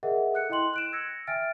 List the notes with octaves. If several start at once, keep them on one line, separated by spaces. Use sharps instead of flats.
G#4 A#4 D#5 E5 F#5
A4 F#6 C#7
E4 D#5 G5 C6 F#7
F#6 D7 E7
E6 G#6 A#6 C#7
E5 G5 G#5 F6 A6 D7